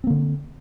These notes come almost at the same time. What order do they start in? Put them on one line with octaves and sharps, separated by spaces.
C4 A#3 D3